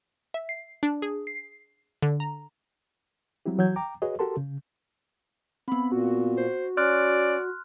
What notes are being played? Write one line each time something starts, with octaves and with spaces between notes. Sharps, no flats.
E5
C7
D4
G#4
C7
D3
A#5
F#3 G3 C4 E4 G4
E3 F#3 F#4 C#5 G6 G#6
G5 A#5 D6
F#4 G#4 B4 C#5 D#5
F#4 G4 A4 A#4 A5 C6
C#3
B3 C4 B5
A#2 F#4
C5
C#4 D5 C6 F6 F#6